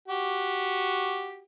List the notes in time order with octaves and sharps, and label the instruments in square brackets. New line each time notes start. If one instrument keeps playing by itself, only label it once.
[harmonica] F#4 G4